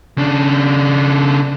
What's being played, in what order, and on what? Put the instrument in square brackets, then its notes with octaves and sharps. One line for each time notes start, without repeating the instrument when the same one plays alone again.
[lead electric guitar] C#3 D4